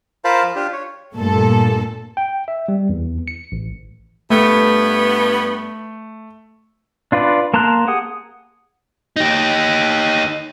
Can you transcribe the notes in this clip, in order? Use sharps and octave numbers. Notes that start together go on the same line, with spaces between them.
F4 A#4 C5 F5 A5 B5
F3
D4 F4 G4
C#5
G2 A#2 A3 A4
G5
E5
G3
E2
C#7
A1
G2 A3 B3
D4 F4 B4 D5
A#3 A5 A#5 C6 F#6
G4 G#4 F#5 D#6
D#4 G4